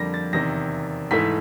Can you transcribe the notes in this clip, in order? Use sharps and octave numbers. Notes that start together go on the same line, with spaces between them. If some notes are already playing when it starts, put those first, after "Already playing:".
Already playing: F2 D3 G3 A#3 A#6
A6
E2 C3 D#3 A#6
G#2 E3 A3 B6